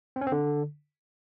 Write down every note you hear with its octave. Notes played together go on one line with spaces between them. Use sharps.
C4
C#4
C4
D3